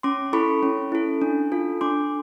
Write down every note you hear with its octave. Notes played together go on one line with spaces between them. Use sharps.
C#4 C6 D6
E4 A4 B5 C#6
C#4
E4 A4
D4
F4 A4
D4 C6 D6